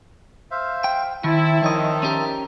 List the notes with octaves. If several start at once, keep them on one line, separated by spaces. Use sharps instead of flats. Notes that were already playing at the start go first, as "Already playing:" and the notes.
C5 E5 F5
G5
D#3 C4 E4 E5 A5
D#3 F3 C#5 D#5
C#4 G4 A#4